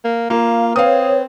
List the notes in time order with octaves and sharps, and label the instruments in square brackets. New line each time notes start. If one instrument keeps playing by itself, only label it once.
[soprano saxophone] A#3
[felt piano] A#3 [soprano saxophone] F4 [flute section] F5
[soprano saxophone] C4 [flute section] B4 C#5 [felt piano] F5 D#6